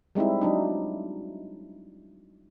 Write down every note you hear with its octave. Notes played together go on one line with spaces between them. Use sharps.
G3 G#3 C4 D#4 E4
F#3 D4 D#4